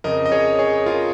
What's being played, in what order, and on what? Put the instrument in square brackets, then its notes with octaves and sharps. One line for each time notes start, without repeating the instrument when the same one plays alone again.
[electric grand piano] F2 C#3 A#4 D#5
D#5
G#4 C#5
G#4 C#5
F4 A#4